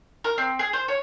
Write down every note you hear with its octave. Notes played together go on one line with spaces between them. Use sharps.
A#4
C4
G#4
C5
C#5